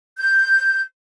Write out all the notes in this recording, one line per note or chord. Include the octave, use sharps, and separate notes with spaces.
G6